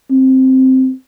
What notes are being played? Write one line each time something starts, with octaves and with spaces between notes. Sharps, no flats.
C4